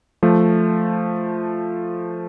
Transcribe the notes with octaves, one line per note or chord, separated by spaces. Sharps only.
F3 A3